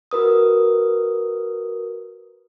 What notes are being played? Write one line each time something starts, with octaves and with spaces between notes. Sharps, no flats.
F#4 A#4 B4 D#6